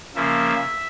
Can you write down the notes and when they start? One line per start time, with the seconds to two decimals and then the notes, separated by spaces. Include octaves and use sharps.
0.15 C#3 F3 A#3 E5